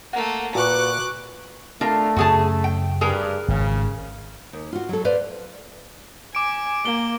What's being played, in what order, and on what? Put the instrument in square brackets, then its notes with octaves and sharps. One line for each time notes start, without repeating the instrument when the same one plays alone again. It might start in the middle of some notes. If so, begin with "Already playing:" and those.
[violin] A3 A#3 [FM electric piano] F#5
[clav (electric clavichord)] A#2 [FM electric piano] F#4 C#6 [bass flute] B4 [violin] D6 F#6
[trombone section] A3 [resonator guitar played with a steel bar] D4 F4 A#4
[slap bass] F#2 C#3 [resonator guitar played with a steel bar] F#4 G#4 A5
[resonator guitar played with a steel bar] G5
[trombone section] G2 [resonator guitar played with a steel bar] G#4 A#4 B4
[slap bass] G#1 [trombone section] C#3
[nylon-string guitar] D#2
F4 F#4
F#3 A4
B4 C5 D5 E5 F5
[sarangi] G#5 [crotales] D6 D7
[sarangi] A#3 [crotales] G7